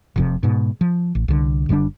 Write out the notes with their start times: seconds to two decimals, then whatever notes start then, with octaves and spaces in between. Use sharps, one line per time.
0.16 F1 F2 C3
0.43 G#2 B2
0.81 F3
1.15 A1
1.28 C2 D3
1.69 F#1 D3 G3 D4